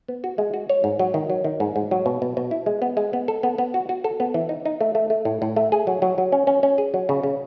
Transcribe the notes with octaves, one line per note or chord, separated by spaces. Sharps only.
B3
F#4
G#3
F#4
C#5
G#2
F#3
D#3
F#3
D#3
G#2
G#2
F#3
B2
B2
B2
E4
G#3
B3
G#3
B3
A4
B3
B3
F#4
F#4
A4
B3
E3
D#4
D#4
A3
A3
A3
A2
A2
A3
G#4
F#3
F#3
F#3
C#4
C#4
C#4
G#4
F#3
C#3
C#3